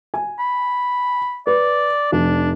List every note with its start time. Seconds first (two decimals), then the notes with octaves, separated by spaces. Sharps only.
0.14 G#5
0.40 B5
1.47 B4 D5
2.12 F1 D4